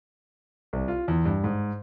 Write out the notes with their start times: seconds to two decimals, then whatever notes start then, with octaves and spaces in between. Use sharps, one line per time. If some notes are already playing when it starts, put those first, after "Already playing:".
0.73 C2
0.88 F4
1.08 E2
1.26 G2
1.44 G#2